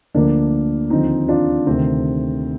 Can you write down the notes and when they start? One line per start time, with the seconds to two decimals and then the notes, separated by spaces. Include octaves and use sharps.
0.14 D2 D3 F3 A#3 D4
0.90 D#2 D3 F3 C4 D#4
1.29 D4 F4
1.67 D2 C3 D#3 C4